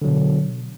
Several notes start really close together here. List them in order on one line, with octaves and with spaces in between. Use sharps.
D3 F#3 B2